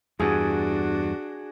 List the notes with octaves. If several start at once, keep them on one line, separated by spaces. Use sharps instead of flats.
E2 G2 D4 F#4 G#4